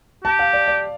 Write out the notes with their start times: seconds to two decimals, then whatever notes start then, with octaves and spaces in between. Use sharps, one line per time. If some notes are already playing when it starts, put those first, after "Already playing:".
0.24 G4 A5
0.39 F5
0.53 D5
0.68 D5